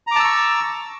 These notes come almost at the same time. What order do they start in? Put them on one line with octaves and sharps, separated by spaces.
A#5 D6 A5 E6 C#6